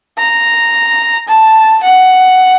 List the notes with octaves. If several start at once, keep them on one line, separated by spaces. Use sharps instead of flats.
A#5
A5
F#5